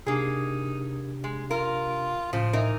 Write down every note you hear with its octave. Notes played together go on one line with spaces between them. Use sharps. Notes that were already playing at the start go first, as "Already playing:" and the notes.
C3 A#3 D4 D#4 G4 G#4
G#3
F4 A#4
A2 C#3 F3
E3 D#4 A#4